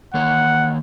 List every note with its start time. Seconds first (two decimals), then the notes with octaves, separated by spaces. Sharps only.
0.14 D#3 A#3 C#5 F#5